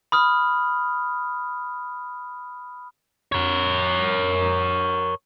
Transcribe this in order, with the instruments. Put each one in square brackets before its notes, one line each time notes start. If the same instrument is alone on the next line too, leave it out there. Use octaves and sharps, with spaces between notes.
[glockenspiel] B5 D#6 F6
[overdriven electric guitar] A#4 C#5